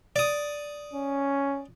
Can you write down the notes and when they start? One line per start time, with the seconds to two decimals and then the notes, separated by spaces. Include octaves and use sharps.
0.16 D5 D#6
0.93 C#4